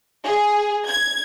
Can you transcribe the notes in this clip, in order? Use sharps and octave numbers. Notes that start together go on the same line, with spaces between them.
G#4
G#6